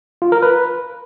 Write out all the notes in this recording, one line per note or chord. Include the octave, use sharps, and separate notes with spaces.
F4
A#4
B4